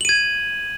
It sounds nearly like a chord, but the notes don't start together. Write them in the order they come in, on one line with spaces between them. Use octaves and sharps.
F#7 D#7 G#6